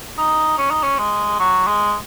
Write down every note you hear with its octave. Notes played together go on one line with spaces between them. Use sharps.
D#4
C#4
D#4
C#4
G#3
F#3
G#3